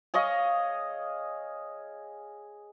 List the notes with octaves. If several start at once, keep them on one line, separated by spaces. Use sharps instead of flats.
G#4 C#5 D#5 F5